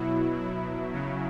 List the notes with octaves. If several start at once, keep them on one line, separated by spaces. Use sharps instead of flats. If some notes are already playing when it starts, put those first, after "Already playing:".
Already playing: B2 F#3 E4
E4
C#3 F#3